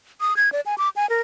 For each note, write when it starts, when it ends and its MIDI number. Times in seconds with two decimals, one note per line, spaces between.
0.21 0.36 87
0.36 0.52 92
0.52 0.61 74
0.66 0.75 80
0.78 0.89 86
0.96 1.09 80
1.09 1.21 70